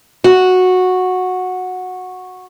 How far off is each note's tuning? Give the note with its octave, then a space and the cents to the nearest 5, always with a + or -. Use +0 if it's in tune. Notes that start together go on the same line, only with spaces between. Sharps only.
F#4 -10